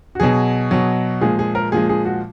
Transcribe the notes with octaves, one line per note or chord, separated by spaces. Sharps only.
F#4
B2 F#3 G#4
B2 F#3
A#2 F3 G#3 G#4
G#4
A#4
A#2 F3 G#3 G#4
G#4
F#4